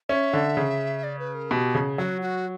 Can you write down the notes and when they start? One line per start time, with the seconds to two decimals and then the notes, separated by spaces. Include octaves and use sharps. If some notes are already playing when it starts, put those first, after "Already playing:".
0.09 C#4 E5
0.33 D3
0.57 C#3
1.03 D5
1.19 B4
1.35 A#4
1.51 B2 G4
1.75 C#3
1.98 F#3 F#4
2.21 F#4